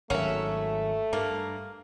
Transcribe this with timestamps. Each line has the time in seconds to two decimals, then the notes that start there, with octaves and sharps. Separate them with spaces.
0.10 G#1 F#3 A3 A#3 C#4 E5 F#5
1.13 G2 A#3